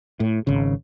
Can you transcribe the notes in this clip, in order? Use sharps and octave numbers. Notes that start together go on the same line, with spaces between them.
A2
G#1 C#3